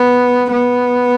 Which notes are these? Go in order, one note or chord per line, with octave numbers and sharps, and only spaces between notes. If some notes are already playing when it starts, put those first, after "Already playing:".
Already playing: B3
B3